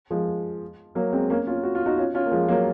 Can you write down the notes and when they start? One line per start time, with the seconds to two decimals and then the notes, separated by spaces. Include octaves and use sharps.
0.11 F3 G#3
0.95 F#3 A#3
1.13 G#3 C4
1.30 A#3 C#4
1.47 C#4 F4
1.63 F#4
1.75 F4
1.86 D#4 F#4
1.98 C#4 F4
2.14 C#4 F4
2.26 A#3
2.31 F3 G#3
2.48 F#3 A#3